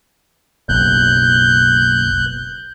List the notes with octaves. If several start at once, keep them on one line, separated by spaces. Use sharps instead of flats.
F#1 B1 F#6 G6